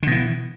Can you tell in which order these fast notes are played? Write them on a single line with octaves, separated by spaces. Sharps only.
D3 B2 E3